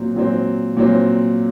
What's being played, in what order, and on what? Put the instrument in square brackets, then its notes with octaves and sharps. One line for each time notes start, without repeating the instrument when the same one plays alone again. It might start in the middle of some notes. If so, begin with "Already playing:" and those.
Already playing: [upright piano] A#2 F#3 C4
A#2 F#3 C4
A#2 F#3 C4